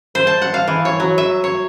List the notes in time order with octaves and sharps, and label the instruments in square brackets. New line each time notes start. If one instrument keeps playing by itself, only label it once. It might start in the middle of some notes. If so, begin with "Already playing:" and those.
[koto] C5
A5
F#5
F5
E3
C#5
F#3
E5
C#5